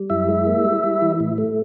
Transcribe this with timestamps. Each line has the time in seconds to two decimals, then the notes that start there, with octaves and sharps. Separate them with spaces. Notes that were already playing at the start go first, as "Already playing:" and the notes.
Already playing: G3
0.10 F#2 E4 E5
0.29 G#3
0.47 A#3
0.65 G3
0.83 G3
1.02 E3
1.20 A2
1.38 A3